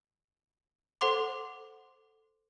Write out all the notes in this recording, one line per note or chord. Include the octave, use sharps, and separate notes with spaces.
A4 C5 F#5 C6 D6